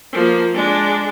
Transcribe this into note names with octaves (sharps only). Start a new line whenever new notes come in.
F3 A#3
G#3 D4